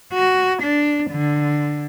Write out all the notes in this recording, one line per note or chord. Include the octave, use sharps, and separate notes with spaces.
F#4
D4
D3